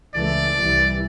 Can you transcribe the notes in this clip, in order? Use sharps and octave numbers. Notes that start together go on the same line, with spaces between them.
C#2 E3 A3 D5
C2 E3 G3